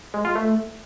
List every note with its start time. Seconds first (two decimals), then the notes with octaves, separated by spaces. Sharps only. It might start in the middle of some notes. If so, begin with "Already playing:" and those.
0.14 G#3
0.25 F4
0.35 A3